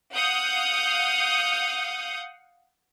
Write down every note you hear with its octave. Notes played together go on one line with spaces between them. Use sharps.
F5 F#5 D#6 G6